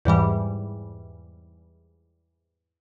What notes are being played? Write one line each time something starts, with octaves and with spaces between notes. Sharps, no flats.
E2 G#2 E3 G3